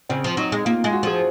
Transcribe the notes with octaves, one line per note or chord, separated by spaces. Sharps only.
C#3 C4
F3
F#3 D#4
G#3
A#3 F4
G#3
F#4
F3 G#4